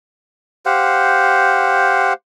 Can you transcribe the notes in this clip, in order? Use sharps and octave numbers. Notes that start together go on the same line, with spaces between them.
G4 C5 F5 F#5